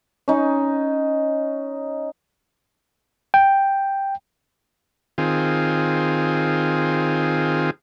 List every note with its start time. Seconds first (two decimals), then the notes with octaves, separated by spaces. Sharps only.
0.28 C#4 D#4
3.34 G5
5.18 D#3 C4 F4 G#4